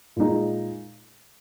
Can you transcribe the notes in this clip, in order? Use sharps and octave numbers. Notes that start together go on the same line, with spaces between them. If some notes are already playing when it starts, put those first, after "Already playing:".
A#2 G#3 D#4